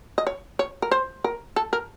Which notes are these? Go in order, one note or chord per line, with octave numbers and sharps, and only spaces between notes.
D#5
C#5
C#5
A#4
C5
A#4
A4
A#4